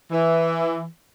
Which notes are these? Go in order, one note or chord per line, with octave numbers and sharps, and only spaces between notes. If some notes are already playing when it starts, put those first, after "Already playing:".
E3